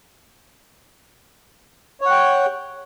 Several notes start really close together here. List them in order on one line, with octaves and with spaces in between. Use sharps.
C#5 F#5 G5